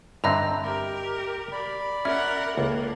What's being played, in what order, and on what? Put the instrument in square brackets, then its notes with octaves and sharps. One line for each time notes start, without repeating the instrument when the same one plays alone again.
[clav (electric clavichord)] G2 D3 C4 [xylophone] D#5 E5 A#5
[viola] G4 A#4
[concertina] D5 B5
[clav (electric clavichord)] C#4 [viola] A#4 F#5 [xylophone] E5
[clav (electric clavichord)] C#2 [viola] A#3 A4